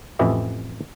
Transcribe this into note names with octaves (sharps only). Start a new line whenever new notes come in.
A1 F2 E3 E4 G4 D#5